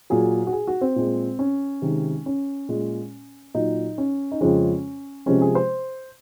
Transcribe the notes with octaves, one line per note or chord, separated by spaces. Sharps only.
A#2 F#3 G#4
F#4
G#4
F#4
C4
A#2 G#3
C#4
C3 D#3 G#3
C#4
A#2 G#3
A#2 F#3 D#4
C#4
D#4
F2 C#3 F3 G#3 C#4
C3 F3 G#3 C#4
G#4
C5